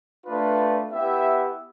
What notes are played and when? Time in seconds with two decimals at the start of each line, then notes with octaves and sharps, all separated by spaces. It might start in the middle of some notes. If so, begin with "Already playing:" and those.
0.25 A3 D4 F4 B4
0.92 B3 E4 G4 E5